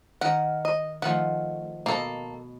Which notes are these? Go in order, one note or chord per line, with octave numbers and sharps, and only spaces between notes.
D#3 A#4 F#5
D#5
D#3 F3 A3 F#5
B2 A#3 A4